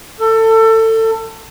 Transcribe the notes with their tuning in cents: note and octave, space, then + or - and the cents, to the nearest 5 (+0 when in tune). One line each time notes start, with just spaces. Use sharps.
A4 +25